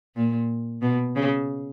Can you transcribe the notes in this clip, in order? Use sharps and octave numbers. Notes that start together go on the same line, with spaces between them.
A#2
B2
C#3